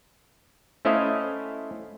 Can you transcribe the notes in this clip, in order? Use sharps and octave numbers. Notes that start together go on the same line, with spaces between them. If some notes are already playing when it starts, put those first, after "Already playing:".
A3 C#4 E4 C5 D#5 F5